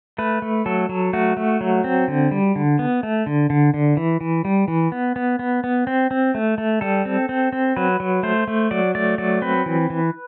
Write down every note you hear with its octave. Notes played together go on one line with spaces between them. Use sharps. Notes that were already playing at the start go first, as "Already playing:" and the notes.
A3 B4
A3
F#3 A4
F#3
A3 F#4
A3
F#3
C4
D3
G3
D3
B3
A3
D3
D3
D3
E3
E3
G3
E3
B3
B3
B3
B3
C4
C4
A3
A3
G3 A4
C4
C4
C4
F#3 B4
F#3
A3 C5
A3
F#3 D5
A3 D5
F#3 D5
C4 B4
E3
E3